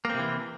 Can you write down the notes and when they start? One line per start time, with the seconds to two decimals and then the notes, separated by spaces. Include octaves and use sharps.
0.05 A#3
0.10 C4
0.14 C3
0.19 E3